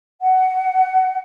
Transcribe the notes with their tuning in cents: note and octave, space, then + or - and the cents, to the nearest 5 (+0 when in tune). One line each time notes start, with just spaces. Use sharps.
F#5 +15